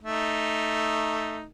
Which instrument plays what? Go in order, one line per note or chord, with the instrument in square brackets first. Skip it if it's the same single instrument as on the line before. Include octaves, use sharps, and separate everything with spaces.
[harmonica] A3 D#4